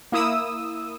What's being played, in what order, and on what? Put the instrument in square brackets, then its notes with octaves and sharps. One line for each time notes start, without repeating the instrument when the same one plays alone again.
[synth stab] A#3 E4 D#6 E6